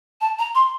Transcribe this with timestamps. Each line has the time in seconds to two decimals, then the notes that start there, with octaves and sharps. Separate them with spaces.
0.21 A5
0.39 A#5
0.55 C6